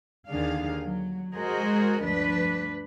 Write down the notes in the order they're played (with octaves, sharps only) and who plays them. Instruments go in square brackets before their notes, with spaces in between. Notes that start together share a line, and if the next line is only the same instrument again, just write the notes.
[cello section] D#2 D3 D#3 D4 G#4 F5
F#3
G#3 F#4 G#4 A#4 C5 D#5
D2 G2 F3 D4 B4